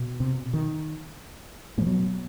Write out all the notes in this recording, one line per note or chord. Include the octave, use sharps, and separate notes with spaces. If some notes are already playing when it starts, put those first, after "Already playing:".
Already playing: B2
C3
D#3
A2 E3
B2 F#3